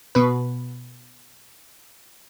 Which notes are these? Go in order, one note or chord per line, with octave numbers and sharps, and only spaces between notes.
B2 B4